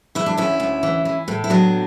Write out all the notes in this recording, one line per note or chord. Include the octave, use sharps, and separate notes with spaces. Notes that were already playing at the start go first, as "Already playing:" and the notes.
E3 E4
D4
D2 C#4 E4
D2
E3
E3
A2
E4
F#3 B3 D4